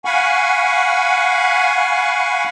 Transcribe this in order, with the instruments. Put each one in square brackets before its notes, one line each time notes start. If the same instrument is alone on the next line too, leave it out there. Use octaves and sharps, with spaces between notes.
[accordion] F5 F#5 G#5 B5 C#6